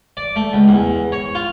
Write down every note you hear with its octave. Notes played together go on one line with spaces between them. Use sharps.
D5
A3
C#2
E2
C#5
F4